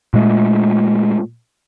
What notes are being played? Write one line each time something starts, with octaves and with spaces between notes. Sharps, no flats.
A#2 G#3 A3